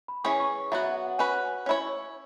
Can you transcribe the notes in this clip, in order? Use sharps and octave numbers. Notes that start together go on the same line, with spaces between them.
B5
E3 C#4 G#4 C#5 C#6
C#6
C#6
F#3 B3 F#4 E5
E5
F#5
F#5
C#4 F#4 B4 G#5
C#4 E4 C#5